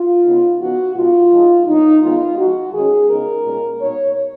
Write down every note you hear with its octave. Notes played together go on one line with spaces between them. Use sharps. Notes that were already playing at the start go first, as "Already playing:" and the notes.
Already playing: F4
C#3 G#3 B3 D#4
C#3 F3 B3 D#4 F#4
B2 G#3 D#4 F4
F3 G#3 D#4
B2 F#3 A#3 D#4
D#3 G#3 B3 D#4 F4
F3 G#3 D#4 F#4
D#3 G#3 C#4 G#4
C#3 G#3 B3 D#4 A#4
A#2 G#3 C#4
B2 A#3 D#4 C#5